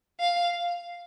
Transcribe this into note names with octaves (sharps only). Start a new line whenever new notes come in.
F5